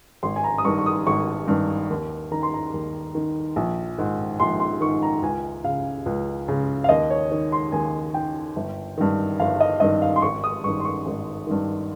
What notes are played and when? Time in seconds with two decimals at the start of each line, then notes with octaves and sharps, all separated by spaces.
0.23 G#1 C6
0.36 G#5
0.44 A#5
0.58 D#6
0.65 G2 D#3 C#6
0.79 C#6
0.86 D#6
1.07 G#1 C#6
1.48 G2 D#3
1.90 D#2
2.31 D#3 A#5
2.43 C6
2.54 A#5
2.74 D#2
3.15 D#3
3.56 A#1
3.98 G#2 D#3
4.40 A#1 C6
4.60 C6
4.81 G#2 D#3 C#6
5.03 A#5
5.22 C#2 G#5
5.64 C#3 F5
6.06 C#2
6.48 C#3
6.84 F5
6.89 D#2 D#5
7.10 C#5
7.31 D#3 C#5
7.52 C6
7.72 D#2 G#5
8.14 D#3 G5
8.56 G1
8.97 G2 D#3
9.39 G1 F5
9.60 D#5
9.80 G2 D#3 D#5
10.02 F5
10.16 C6
10.22 G#1 C#6
10.44 D#6
10.64 G2 D#3 C#6
10.80 C6
10.85 C#6
11.06 G#1
11.47 G2 D#3